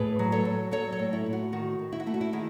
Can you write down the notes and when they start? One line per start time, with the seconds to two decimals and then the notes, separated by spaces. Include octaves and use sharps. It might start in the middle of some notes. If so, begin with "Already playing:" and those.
Already playing: A2 G#4 B4
0.19 F#3
0.32 A4 C#5
0.45 F#3
0.71 F#3 A4 C#5
0.92 A4 C#5
0.99 A2
1.13 E4
1.26 A2
1.33 F#4
1.52 D#3 F#4
1.79 D#3
1.92 E4
2.00 F#4
2.06 A3 E4
2.14 F#4
2.21 E4
2.33 D#3 E4 G#4